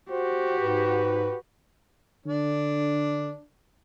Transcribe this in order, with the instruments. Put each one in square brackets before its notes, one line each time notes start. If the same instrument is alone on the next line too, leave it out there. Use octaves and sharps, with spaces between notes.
[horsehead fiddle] F#4 G4 [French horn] C5
[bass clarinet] G#2 [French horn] B4
[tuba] D3 [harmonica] D4